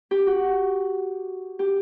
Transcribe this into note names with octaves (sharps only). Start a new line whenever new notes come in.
G4
F#4
G4